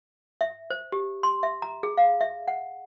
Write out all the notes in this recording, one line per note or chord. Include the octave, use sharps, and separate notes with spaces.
E5
C5
G4
C6
E5
A#5
G#4
F5
E5
F#5